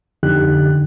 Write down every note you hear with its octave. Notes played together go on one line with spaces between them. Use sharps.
F2 D3 D#4 G4 F#6